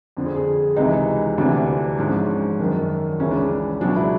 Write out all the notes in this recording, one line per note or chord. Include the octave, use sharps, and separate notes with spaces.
F2 D3 F3
G#4
G#4
C#2 C3 E3 D#4
D2 C3 E3 D4
G#2 F3 D4
C#4
C#4
F#2 D#3 F#3 D4
C#2 C#3 E3 C#4
D4
C#4
C#2 B2 F#3 D4
E4